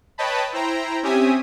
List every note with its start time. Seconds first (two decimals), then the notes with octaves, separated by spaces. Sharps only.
0.18 B4 C#5 D#5 G5 A5 B5
0.53 E4 C5 G5 A#5
1.03 C4 C#4 G4 E5 G#5 D#6